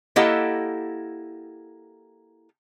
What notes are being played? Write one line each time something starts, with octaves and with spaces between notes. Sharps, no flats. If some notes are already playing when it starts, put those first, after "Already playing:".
A#3 E4 G4 A4 D#5 F#5